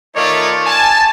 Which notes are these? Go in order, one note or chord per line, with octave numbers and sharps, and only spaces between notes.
D#3 A3 D#4 F4 C#5 D5
G#5 A5